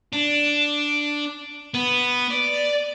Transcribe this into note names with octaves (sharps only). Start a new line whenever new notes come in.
D4
B3
D5